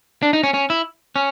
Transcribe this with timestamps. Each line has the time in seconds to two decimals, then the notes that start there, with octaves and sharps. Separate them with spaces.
0.23 D4
0.33 D#4
0.43 C#4
0.54 C#4
0.70 E4
1.16 C#4